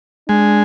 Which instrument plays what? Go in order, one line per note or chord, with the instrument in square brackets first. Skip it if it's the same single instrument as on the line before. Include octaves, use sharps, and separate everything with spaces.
[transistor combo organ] G#3 [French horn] D4